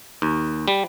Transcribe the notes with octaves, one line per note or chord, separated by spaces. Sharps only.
D#2
G3